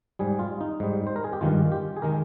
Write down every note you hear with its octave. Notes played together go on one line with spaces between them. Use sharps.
G#2 G3 G#4
F4
D#4
G#2 G3
C5
A#4
G#4
G4
G2 D#3 G#3 F4
G4
G#4
D#3 G#3 A#4